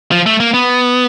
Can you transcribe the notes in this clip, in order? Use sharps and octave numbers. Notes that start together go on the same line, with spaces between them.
F3
A3
A#3
B3